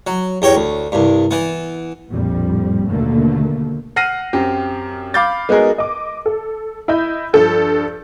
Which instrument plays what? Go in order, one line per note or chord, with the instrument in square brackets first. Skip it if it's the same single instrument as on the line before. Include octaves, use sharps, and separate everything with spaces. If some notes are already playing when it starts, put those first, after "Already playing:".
[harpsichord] F#3
E2 G4 C#5 A#5
D2
C2 G2
E3 B3
[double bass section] A#1 F2 A2 G3
D#2 B2 D3 A3 A#3
[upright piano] F#5 F6 A#6 C7 D#7
F#2 C4 G4
F5 B5 D6 G6 A6
G#3 B3 D#4 F#4 G#4 A#4
[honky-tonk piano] D#5 D6
A4
E4 D#5 B5 G6
G2 F3 A4 G6